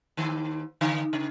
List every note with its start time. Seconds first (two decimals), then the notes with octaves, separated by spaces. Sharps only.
0.17 D#2 D#3
0.81 D3
1.13 C#3